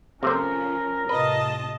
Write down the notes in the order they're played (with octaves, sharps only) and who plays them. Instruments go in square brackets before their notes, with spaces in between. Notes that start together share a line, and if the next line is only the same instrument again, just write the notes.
[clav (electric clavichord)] C3 A3 C5 [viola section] F3 [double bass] C#4 [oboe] A#4
[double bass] A2 C3 [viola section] F4 D#5 A5 [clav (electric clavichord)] B4